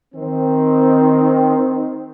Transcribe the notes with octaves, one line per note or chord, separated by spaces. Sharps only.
D#3 C4